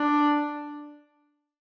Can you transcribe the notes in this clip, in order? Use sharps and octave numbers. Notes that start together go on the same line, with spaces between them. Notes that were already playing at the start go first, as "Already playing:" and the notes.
Already playing: D4